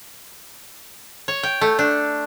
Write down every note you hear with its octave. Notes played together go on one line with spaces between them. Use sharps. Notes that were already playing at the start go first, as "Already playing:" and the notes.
C#5
G5
A3
D4